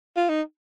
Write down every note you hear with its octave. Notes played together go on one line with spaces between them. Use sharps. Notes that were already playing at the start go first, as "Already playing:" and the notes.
F4
D#4